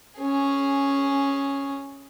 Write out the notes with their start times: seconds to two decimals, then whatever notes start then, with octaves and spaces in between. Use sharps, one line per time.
0.19 C#4 G#4